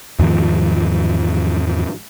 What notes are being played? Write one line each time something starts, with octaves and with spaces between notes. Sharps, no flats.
E2 G#2 D#3 F3